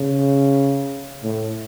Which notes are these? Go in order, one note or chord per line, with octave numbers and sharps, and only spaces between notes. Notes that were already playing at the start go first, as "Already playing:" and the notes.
Already playing: C#3
A2